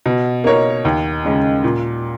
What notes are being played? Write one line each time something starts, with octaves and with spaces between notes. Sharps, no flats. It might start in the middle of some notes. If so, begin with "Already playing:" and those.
B2
A#3 D#4 A#4 C#5
D#2
C#3 G#3 C#4
A#2